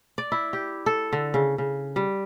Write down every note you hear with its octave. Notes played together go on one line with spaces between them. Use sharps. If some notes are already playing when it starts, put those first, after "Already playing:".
D5
E4
G4
A4
D3
C#3
C#3
G3